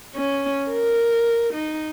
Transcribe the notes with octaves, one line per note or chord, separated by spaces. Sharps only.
C#4
A#4
D#4